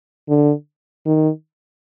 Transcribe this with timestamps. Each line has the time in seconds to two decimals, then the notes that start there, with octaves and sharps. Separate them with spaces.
0.29 D3
1.06 D#3